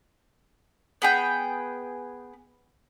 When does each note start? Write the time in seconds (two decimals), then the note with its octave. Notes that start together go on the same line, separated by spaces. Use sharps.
1.02 B3 G#4 G5